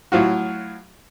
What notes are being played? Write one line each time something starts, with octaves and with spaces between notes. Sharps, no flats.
A2 F#3 F4 F#4